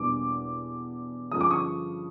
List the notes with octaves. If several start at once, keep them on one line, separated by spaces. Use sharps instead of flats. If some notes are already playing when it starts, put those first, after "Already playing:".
Already playing: E2 B2 G3 A#3 D4 D6
G2 D3 F3 G#3 C#4 D#6
D6
C#6 D#6